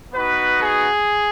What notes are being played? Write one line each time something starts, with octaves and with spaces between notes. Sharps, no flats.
B3 D#4 F#4 B4
G#4